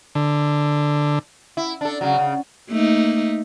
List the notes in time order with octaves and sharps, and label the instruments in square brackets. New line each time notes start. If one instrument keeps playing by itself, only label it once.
[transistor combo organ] D3
[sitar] E4
D4 A4
C#3 F#3
C#3
[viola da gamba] A3 A#3 D#4